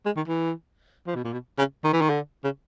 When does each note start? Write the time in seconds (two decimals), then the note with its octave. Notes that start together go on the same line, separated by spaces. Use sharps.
0.06 G#3
0.17 D#3
0.27 E3
1.07 F3
1.15 B2
1.25 A#2
1.33 B2
1.59 C#3
1.84 D#3
1.93 E3
2.01 D#3
2.10 D3
2.44 C#3